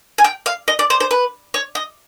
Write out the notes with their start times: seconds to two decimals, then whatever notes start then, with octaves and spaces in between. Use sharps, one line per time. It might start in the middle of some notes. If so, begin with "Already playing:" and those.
0.18 G#5
0.24 G5
0.46 F5
0.68 D#5
0.79 D5
0.90 C5
1.00 C5
1.11 B4
1.54 C#5
1.75 D#5